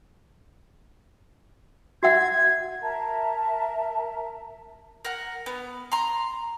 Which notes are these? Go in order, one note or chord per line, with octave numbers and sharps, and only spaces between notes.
F#4 E5 F#5 G#6
A#4 E5 A5 A#5
A#4 F#5
B3
A#5 C6